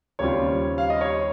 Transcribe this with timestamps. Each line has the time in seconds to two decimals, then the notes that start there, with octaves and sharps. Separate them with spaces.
0.19 D#2 C#3 G3 C4 F4 C#5
0.78 F5
0.90 D#5
1.01 C#5